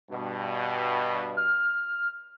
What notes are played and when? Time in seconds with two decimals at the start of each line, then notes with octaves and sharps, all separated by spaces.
0.10 G2 B2
1.37 F6